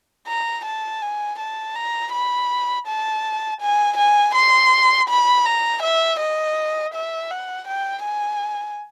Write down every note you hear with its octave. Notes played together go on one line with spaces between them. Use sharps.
A#5
A5
G#5
A5
A#5
B5
A5
G#5
G#5
C6
B5
A#5
E5
D#5
E5
F#5
G5
G#5